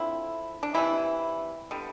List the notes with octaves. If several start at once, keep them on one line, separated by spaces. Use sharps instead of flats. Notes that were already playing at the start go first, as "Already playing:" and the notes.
Already playing: D3 F3 C4 E4
D4
C3 E3 G3 E4
D3 G3 B3